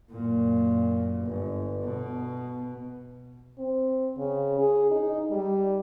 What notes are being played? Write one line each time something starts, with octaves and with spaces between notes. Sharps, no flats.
F#2 A#2
G1
B2
C4
C#3
G#4
D#4
G3